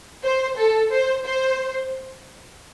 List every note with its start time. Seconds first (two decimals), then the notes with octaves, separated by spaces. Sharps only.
0.23 C5
0.57 A4
0.91 C5
1.24 C5